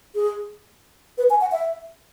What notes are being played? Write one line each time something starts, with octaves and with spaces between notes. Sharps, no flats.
G#4
B4
G#5
F#5
E5